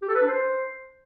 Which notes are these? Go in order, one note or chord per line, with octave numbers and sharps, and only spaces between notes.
G4
A4
B4
D4
C5